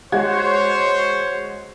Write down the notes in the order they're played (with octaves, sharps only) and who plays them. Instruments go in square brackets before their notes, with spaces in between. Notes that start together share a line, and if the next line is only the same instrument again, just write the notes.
[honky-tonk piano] G#3 F#4 G#6 [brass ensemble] C5 C#5